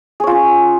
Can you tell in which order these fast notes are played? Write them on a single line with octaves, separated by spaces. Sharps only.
G#4 C#5 F4 C#4